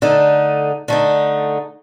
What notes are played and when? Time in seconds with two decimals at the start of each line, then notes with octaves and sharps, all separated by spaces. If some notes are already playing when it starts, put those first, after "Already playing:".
0.02 D3 A3 D#4
0.88 D3 A3 D#4